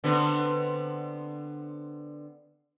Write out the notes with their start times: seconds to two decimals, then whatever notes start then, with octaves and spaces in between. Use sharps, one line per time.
0.04 D3 B3 C4